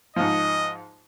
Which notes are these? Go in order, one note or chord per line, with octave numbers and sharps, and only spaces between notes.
G#2 F3 D#5